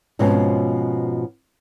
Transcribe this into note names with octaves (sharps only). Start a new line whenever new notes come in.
G#2 B2 F3 C4 C#4